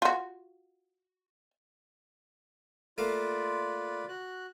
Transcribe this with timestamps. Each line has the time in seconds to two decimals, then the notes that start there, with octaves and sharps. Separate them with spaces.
0.02 F4 F#4
2.98 A3 A#3 F4 B4 D5 F5
4.08 F#4 F#6